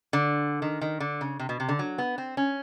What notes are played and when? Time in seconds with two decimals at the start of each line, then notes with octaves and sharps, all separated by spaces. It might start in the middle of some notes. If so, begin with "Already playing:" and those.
0.13 D3
0.62 D#3
0.81 D#3
1.00 D3
1.21 C#3
1.40 C3
1.49 B2
1.60 C3
1.69 D3
1.79 F#3
1.98 B3
2.18 C4
2.37 C#4